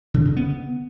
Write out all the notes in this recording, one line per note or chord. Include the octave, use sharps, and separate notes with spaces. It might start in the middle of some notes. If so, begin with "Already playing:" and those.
D3
C#3
B3